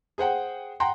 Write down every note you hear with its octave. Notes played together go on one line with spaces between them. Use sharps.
G#4 C5 F#5 G5
F#5 G5 A#5 C6